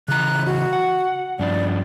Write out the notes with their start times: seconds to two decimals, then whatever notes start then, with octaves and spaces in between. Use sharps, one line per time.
0.08 C#3 E3 A#5 F#6
0.46 F#4
0.73 F#5
1.39 G2 F3 D4 D5